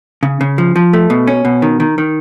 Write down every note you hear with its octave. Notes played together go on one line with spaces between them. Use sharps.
C#3
C#3
F3
F3
A3
B2
C#4
B2
D#3
D#3
D#3